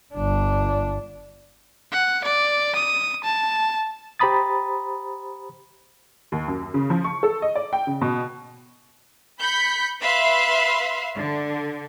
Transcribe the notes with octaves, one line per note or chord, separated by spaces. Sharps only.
G1 D4
F#5
D5
D#6
A5
G4 C5 A#5 B5 D#6 A6
D#2
F#2
C#3
F3
C#6
A4
D#5
D5
G5
C#3
B2
B5 G6 B6 C#7
B4 E5 F5 B5 C6
D3